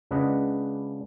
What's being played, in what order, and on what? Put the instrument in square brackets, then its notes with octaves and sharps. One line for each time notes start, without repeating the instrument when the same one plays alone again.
[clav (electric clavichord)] C#2 C#3 D4 B4 D#5 F#5